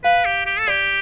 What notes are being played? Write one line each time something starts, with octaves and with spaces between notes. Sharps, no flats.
B4 F5
G4
G4
A4
G4 D5